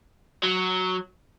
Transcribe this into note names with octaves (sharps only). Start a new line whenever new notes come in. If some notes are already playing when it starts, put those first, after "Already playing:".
F#3